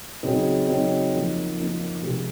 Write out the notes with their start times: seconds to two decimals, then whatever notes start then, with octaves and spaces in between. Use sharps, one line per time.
0.23 C#3 F#3 C4 D#4
0.68 C#3 F#3 C4 D#4
1.13 F3 A#3 D#4
1.57 F3 A#3 D#4
2.02 C3 F3 G#3